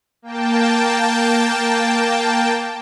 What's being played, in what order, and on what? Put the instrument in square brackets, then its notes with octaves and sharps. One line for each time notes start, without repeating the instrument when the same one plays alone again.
[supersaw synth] A#3 G5 A5